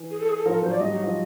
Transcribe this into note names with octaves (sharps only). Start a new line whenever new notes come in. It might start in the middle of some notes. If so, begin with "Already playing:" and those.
Already playing: E3
G#4
A4
G#4
A4
F3 A#4
A4
F#3 C5
D5
G3 D#5
F#3
F3